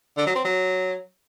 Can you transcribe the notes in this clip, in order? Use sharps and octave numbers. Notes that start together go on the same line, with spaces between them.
D3
F#3
C4
F#3